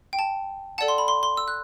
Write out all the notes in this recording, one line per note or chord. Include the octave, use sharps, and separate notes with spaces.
G5
A5
A4 D5 F#5 A5
C6
B5
C6
C6
E6
F#6